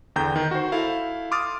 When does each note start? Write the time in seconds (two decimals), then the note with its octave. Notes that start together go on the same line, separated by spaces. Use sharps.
0.16 E2 D3 G5 A#5 G6
0.36 D#3
0.51 F#4 C5
0.72 E4 A4 F5
1.31 C6 D6 D#6 F6 A6